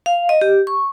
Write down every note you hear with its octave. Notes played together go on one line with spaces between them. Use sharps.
F5
D#5
G4
C#6